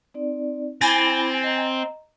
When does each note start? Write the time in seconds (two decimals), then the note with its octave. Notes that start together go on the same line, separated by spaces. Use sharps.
0.14 C4 D#4 D5
0.81 C4 E4 G#5 B5 D6 A6 A#6
1.43 D#5 A#5